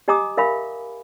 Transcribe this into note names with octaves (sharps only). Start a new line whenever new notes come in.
G4 D#5 G#5 A#5 D6 D#6
A#4 E5 F5 G#5 B5